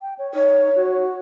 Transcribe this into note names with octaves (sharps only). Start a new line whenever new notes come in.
G5
C#5
D#4 C#5
F#4